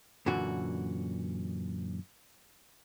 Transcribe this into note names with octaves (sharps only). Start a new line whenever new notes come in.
F#2 A#2 D3 E3 F#4